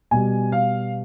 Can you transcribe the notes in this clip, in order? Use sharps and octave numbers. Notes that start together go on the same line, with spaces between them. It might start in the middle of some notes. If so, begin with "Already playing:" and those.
B2 G3 G#5
F5